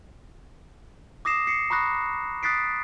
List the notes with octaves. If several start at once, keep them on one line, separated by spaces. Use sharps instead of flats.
D6 D#6 A#6 C7 E7
C7 C#7
A#5 B5 C#6 D#6 F#6 A#6
D#6 F#6 A6 B6 C7 D7